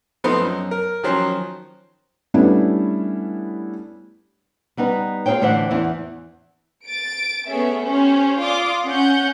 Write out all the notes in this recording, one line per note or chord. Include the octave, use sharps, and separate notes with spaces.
F3 A3 B3 C4 D#4 C5
F#2
A#4
D#3 F3 F#3 C#4 C5
G3 A3 B3 C#4 D4 E4
G3 B3 D#4 B4
F4 G#4 A4 C5 C#5 G5
A2 D3 E3 C5 E5 F#5
E2 E3 E4
A6 D7
A3 B3 C#4 G#4 E5
C#4 G4 C5
F4 D5 C6 D6 D#6
C#4 F#5 G6